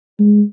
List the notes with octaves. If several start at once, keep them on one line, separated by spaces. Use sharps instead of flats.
G#3